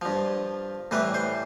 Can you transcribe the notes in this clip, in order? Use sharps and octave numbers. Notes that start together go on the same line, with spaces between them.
G2 F3
A2 E3 G3 B4
C5